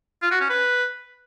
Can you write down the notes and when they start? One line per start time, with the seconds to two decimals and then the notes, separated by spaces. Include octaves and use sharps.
0.22 F4
0.31 F#4
0.40 C#4
0.49 B4